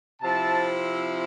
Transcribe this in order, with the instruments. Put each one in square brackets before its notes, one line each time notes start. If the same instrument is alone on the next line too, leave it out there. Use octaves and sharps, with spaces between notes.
[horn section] C3 F3 C4 E4 A5